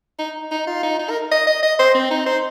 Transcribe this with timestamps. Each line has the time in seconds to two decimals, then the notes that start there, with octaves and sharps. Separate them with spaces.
0.19 D#4
0.51 D#4
0.67 F4
0.83 D#4
0.99 D#4
1.10 A#4
1.32 D#5
1.47 D#5
1.63 D#5
1.79 C5
1.95 C4
2.11 D#4
2.26 C5